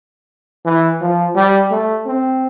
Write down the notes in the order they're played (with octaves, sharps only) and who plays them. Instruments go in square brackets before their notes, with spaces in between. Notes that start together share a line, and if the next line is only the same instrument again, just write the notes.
[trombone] E3
F3
G3
A3
C4